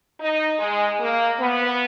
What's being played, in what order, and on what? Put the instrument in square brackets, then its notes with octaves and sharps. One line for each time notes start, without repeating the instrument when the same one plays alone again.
[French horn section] D#4
G#3
A#3
B3